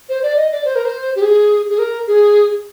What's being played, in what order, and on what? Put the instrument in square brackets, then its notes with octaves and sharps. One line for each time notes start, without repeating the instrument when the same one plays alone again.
[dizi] C5
D5
D#5
D5
C5
A#4
C5
G4
G#4
G#4
A#4
G#4